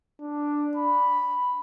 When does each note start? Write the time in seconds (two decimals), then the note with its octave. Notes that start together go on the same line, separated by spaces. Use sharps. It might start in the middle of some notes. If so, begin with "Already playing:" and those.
0.20 D4
0.77 B5